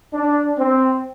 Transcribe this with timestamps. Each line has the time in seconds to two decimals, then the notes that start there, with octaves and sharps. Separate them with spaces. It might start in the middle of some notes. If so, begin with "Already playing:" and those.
0.13 D4
0.58 C4